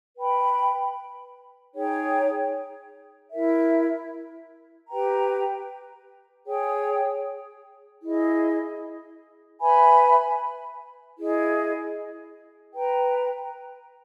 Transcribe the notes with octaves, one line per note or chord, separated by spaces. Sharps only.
B4 G5 B5
D#4 G#4 C#5 G5
E4 A#4 E5
G4 B4 G5 A#5
G#4 C#5 G5
E4 G#4 D#5
B4 E5 G#5 B5
E4 G#4 D#5
B4 G5 A#5